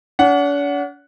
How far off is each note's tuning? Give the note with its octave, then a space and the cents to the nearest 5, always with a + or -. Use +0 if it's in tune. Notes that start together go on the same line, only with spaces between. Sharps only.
D4 -45 F#5 +0